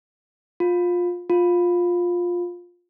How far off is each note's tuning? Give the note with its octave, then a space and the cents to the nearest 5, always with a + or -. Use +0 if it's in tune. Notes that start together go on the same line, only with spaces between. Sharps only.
F4 +20
F4 +15